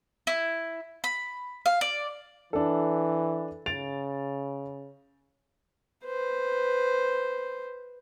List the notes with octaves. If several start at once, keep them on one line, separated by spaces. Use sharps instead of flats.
E4
B5
F5
D5
E3 D4 A4
C#3 A6 D7 F7
B4 C5